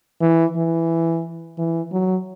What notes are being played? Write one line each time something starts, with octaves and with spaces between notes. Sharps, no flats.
E3
E3
E3
F#3